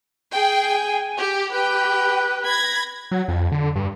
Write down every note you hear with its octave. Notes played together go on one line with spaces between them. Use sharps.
G#4 G5
G#5
G4
G4 B4 G5
B5 G#6 A#6
F#3
F2
D3
G2